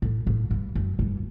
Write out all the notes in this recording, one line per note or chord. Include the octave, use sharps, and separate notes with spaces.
A2
A2
G2
F#2
G2